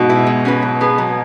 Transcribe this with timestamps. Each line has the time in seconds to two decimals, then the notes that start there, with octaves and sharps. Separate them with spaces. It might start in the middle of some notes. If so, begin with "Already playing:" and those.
Already playing: G#2 B2
0.09 E4 B4
0.27 G#3
0.45 C#4 F#4 B4
0.62 F#3
0.81 B3 G#4 B4
0.98 F#3